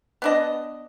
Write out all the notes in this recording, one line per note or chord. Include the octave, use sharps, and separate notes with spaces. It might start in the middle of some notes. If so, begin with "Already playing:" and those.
B3 D4 D#5